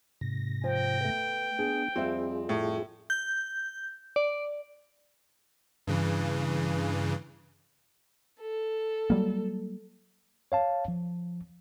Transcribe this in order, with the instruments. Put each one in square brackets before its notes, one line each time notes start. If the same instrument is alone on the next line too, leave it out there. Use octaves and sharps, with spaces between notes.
[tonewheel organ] G#2 C3 A#6
[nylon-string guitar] F3 [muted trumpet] G5
[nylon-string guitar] A3 B3
[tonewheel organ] B3 D4 [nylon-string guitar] G#4
[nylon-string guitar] F2 G3 E5 [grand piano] C4 [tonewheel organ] F4 G#4
[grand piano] A2
[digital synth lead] G6
D5
[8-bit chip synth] G2 C#3 E3
[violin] A4
[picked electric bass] F#3 G3 A#3
[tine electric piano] C#5 F5 A5
F3